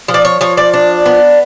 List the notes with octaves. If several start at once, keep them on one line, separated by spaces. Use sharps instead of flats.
F3
D5
C#5
F3 C#5
D5
D4
B3